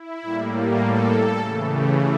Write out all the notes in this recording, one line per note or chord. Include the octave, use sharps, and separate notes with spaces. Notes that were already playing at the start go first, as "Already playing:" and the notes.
Already playing: E4
A2 G3 A#3
A4
C#3 E3 A3
G4